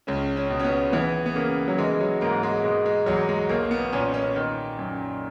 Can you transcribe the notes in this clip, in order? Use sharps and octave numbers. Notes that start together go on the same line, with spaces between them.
C#2 C#4
C#4
B2
C#4
B3
E3 B3
B3
C#3 A#3
F#3
E3 G#3
G#3
F#3
G#2 A#3
G#3
B2 G#3
G#3
E2 F#3
G#3
B1 A#3
A#3
B3
A#2 C#4
C#4
D#3
F#2